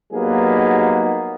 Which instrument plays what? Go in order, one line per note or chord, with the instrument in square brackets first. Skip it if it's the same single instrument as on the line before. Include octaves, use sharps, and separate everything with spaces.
[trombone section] F#3 G3 A#3 B3 D#4 G#4